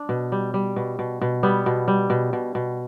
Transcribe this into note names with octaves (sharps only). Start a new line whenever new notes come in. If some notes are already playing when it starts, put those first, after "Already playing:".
Already playing: D4
B2
G3
G3
B2
B2
B2
G3 B3
B2
G3
B2
B2
B2